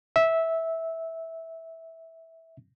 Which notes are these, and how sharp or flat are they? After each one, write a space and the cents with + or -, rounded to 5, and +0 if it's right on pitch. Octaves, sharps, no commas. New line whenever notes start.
E5 -10